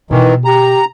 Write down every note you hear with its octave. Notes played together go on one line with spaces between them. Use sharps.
B2 D#3 E3 E4
G4 A#5